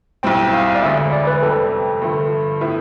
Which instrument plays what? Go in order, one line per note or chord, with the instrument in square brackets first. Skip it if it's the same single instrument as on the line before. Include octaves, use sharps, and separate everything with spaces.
[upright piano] B1 A2 G3 C4 [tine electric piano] G5
[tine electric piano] F5
D5
[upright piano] E1 D2 D3 [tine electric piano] E5
[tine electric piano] D5
B4
[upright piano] G1 F2 C3 [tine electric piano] A4
[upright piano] G2 D3 F3 A3
A2 F3 B3 E4